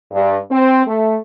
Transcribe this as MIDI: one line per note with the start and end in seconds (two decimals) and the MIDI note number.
0.11 0.37 43
0.51 0.81 60
0.86 1.16 57